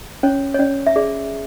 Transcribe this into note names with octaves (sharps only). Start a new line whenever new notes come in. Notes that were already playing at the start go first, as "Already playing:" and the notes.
C#4 C#5
C#5
C#4 D5
E5
G#4 D5